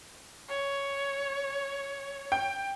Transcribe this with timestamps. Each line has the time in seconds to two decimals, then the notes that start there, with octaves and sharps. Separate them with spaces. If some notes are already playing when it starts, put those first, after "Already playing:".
0.48 C#5
2.32 G5